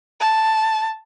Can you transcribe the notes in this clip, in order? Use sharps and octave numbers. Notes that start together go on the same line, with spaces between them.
A5